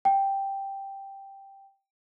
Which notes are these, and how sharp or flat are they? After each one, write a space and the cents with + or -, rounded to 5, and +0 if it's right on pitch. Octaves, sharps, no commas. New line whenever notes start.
G5 +0